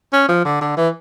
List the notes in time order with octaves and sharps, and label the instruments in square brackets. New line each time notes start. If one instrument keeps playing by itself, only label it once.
[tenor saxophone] C#4
F3
D3
D3
E3